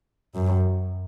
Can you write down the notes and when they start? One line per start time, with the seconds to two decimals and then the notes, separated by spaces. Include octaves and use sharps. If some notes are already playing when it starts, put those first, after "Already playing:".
0.35 F#2